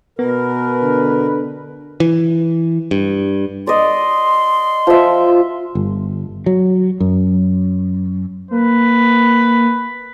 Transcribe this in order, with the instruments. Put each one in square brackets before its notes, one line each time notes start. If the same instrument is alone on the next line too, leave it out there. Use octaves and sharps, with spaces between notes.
[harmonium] B2 A#4 [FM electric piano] B3 [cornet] B4
[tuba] D3
[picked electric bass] E3
G2
[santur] D5 D#5 [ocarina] C6
[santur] F3 E5
[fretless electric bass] G1
F#3
F#2
[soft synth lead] A#3 [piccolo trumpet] B4